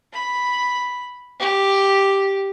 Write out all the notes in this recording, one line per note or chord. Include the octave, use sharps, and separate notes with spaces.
B5
G4